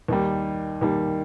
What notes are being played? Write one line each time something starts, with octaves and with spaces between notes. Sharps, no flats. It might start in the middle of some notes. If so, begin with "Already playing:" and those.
D#2 D#3 G3
D#2 D#3 G3